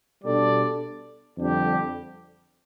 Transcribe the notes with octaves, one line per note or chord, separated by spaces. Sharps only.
B2 G3 D4 A4 D5
F2 D3 G3 D4 G4